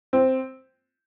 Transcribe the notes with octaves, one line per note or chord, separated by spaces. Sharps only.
C4